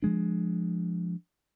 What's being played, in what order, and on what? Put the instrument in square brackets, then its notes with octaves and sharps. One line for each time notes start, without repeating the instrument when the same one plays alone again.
[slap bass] F3 G#3 D4